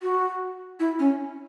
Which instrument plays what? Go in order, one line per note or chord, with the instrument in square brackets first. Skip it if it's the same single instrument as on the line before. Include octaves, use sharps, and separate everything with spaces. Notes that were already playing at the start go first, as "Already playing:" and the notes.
[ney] F#4
E4
C#4